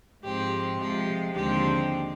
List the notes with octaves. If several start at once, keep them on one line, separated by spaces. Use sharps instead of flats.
G#2 F3 G#3 C4 G4
C3 F3 G#3 G4
D#2 D3 F3 G#3 C4 G4